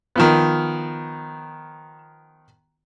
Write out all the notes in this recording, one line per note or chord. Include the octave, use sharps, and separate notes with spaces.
D#3 F3 B3